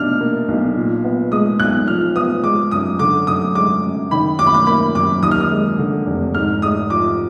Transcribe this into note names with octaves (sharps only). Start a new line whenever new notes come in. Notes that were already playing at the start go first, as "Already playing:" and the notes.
Already playing: B2 D4 F6
A#3
B1
A#2
B3
G#3 D#6
B1 F#6
F3 F6
B3 D#6
G#3 D6
F#2 D#6
D3 D6
F#2 D#6
G#3 D6
F#2
D#3 B5
F#2 D6
B5
D6
A#3 B5
F#2 D6
D#2 D#6
F6
D#6
G#3
D3
F1
G#2 F6
G#3 D#6
F3 D6